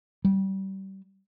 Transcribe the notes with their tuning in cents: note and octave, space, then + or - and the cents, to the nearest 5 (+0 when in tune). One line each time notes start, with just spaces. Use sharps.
G3 -25